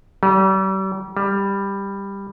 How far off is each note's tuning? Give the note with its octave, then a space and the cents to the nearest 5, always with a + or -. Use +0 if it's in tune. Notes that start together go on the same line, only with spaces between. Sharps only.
G3 -40
G3 +10